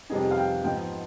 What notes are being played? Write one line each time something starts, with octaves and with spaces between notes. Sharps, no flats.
F2 C3 G3 B3 D#4 G#4
F5
G5
G#2 F3 B3 D#4 G5